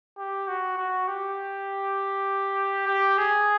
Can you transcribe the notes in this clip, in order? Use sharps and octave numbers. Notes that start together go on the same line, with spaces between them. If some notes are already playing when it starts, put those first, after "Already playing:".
G4
F#4
F#4
G4
G4
G#4